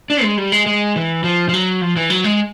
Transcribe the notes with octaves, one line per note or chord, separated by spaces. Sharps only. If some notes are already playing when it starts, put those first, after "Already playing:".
D4
G#3
G3
G#3
G#3
E3
F3
F3
F#3
F3
E3
F#3
G#3